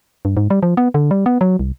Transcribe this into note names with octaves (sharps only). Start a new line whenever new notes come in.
G2
G#2
G3
F3
B3
D3
G3
B3
F#3
C2